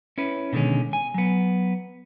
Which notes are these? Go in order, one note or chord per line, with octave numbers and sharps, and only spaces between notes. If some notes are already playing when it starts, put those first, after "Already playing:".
C#4 E4 B4
B2 D3 D#3 G#3 C#4
G#5
F#3 B3